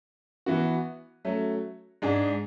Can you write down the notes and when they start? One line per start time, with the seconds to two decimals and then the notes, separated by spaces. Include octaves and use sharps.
0.46 E3 B3 F#4
1.25 F#3 A3 C#4
2.02 G#2 G#3 D4 G#4